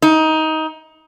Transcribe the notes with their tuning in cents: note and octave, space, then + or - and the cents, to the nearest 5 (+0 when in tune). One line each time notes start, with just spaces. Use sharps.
D#4 +20